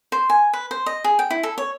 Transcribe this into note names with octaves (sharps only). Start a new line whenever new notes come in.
C5
G#5
B4
C5
D#5
G#4
G5
E4
A4
C#5